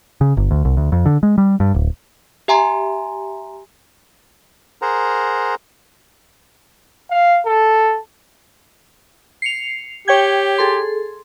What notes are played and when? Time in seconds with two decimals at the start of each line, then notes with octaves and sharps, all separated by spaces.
0.21 C#3
0.37 G1
0.51 D2
0.65 C2
0.77 D2
0.92 F2
1.06 D3
1.23 G#3
1.38 G3
1.60 G2
1.74 D1
2.48 G4 E5 G#5 A#5 C6
4.82 G#4 A#4 C5 F#5 A#5
7.10 F5
7.46 A4
9.42 C7 C#7 F7
10.08 G4 C#5 G5 G#6
10.58 G#4 A4 C6